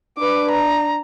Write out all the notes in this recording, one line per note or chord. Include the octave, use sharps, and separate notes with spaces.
D4 B4 D6
A#5